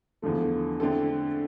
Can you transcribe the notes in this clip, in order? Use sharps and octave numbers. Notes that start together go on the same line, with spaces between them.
E2 D3 F3 A3
D3 A3 C4 E4 A4